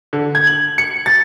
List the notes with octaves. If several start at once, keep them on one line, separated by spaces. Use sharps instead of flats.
D3
G#6
F#7
C#7
A6